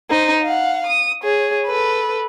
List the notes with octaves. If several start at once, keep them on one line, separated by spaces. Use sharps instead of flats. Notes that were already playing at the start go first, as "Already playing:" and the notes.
D#4 C5
F5 F#5
D#6
G#4 C#5
A4 B4